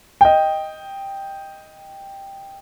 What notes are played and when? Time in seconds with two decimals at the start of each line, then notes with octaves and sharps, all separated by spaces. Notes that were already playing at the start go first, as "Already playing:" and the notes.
0.21 D#5 G5